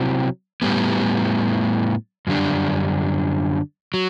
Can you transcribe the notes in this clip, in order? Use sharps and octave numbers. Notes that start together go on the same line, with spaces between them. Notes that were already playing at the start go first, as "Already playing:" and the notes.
Already playing: C3 F#3 C4 E4
A2 G3 B3
F#2 D3 G3 D4
F#3